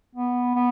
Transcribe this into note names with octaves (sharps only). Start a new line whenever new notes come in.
B3
B3